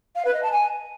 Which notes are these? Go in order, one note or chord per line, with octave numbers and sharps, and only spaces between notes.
F5
B4
D#5
A5
G#5